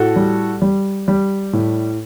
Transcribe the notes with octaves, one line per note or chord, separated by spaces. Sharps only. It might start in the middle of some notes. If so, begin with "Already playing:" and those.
Already playing: A2 F#4 A4
G3
G3
G3
A2